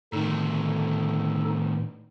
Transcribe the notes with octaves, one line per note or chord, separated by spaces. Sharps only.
A2 D3 D#3 D#4 A4